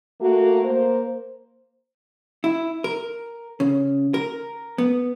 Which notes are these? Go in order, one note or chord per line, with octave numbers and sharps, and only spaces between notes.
A3 A#3 F#4
A#3 C5
E4
A#4
C#3
A#4
B3